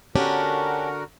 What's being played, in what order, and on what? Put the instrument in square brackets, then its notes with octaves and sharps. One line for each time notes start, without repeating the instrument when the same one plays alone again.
[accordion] D3 F#4 A#4 [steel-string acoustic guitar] C#4 D4 G4